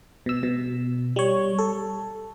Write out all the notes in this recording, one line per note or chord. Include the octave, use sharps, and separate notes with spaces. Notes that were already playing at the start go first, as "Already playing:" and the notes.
B2 E6
B2
G3 C#5
A4